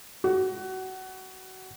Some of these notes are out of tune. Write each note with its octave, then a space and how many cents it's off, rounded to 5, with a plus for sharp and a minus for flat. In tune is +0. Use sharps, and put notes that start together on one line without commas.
F#4 +25